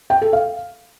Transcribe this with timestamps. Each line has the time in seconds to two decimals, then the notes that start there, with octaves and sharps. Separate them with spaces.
0.10 G5
0.21 A4
0.33 F5